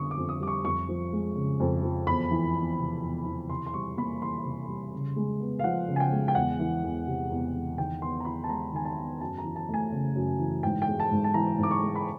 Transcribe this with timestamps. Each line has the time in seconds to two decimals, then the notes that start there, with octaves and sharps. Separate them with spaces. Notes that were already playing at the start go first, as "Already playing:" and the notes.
Already playing: F2 D3 G3 B3 C#6 D#6
0.11 D6
0.17 F2
0.29 D#6
0.40 G3 D6
0.47 C#6
0.65 F2 C#6
0.89 F3
1.13 G#3
1.35 C#3
1.60 F2
1.83 F3
2.07 E2 B5
2.31 E3
2.55 E2
2.79 C3
3.02 E2
3.26 E3
3.49 C3 C6
3.66 C6
3.74 G3 C#6
3.97 A#3 B5
4.22 E3 C6
4.45 C3
4.68 G3
4.93 C#3
5.16 G#3
5.40 B3
5.59 F5
5.64 F3 F#5
5.88 C#3
5.96 G#5
6.00 G5
6.12 G#3
6.28 G5
6.35 E2 F#5
6.59 E3
6.83 E2
7.07 C3
7.31 E2
7.55 E3
7.78 D#3 G5
8.01 B3 C6
8.20 A#5
8.25 E4 B5
8.44 A5
8.49 G#3 A#5
8.73 D#3 G#5
8.85 A5
8.97 B3
9.21 F#2 A5
9.38 A#5
9.44 E3
9.56 A5
9.69 A3 G#5
9.92 C#3
10.15 F#2
10.39 E3
10.63 G#2 G5
10.82 G5
10.88 G#3
11.00 A5
11.11 G#2
11.24 A5
11.34 E3 A#5
11.58 G#2 D6
11.71 C#6
11.83 G#3
11.95 B5